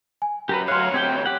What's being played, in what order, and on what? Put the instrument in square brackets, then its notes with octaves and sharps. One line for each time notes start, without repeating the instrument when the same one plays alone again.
[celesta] G#5
[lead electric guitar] F#2 [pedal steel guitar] G4 A#4 B4
[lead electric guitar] D2 C#5 [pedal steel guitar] F#3 F5 [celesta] C6 F6 F#6
[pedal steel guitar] C4 G4 G5 [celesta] G#6 G7
[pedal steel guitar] G4 F#5